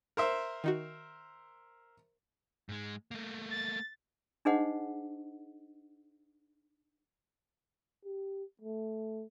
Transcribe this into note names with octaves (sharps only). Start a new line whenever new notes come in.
A#4 C5 E5
D#3 D#4 F#4
G#2 G#3
A3 A#3
A6
D4 D#4 G#4 C5 D#5 F#5
G4
A3